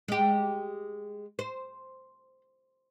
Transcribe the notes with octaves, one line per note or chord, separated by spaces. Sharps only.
G#3 G4
C5